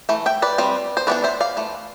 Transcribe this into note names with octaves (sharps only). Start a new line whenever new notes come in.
E3 A3
E5 G5
B4 D5
G3 C4
C5
E3 B3 D4 B4 D5
C5 E5
D5 F5
E3 A3